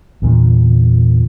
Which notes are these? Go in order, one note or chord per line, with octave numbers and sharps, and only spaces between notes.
E2 A#2 D3